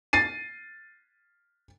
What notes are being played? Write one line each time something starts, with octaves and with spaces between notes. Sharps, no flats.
A6 C7 D#7